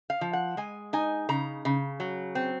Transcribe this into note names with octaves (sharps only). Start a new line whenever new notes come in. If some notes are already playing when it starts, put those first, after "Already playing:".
F5
F3
F#5
G#3 G#5
D#4 G#5
C#3 A#5
C#3
F#3
C4